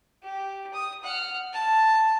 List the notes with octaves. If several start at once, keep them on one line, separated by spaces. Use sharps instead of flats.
G4
D#6
F#5 F6
A5